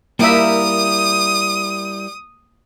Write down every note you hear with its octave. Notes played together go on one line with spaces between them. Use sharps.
G3 A#3 E4 A#4 E5 D#6